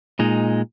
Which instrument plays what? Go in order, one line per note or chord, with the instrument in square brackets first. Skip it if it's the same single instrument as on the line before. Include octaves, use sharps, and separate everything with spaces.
[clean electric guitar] A#2 G#3 D#4